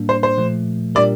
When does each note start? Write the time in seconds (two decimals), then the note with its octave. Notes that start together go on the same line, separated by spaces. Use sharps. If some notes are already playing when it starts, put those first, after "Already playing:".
Already playing: A2 G3 A#3 D4
0.09 C5
0.23 C5
0.38 A#2 F3 A3
0.95 A#2 G3 D4 G4 A#4 D5